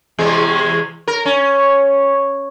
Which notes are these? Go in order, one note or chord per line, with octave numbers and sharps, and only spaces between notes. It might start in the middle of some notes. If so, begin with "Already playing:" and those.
E2 C3 G#3
A#4
C#4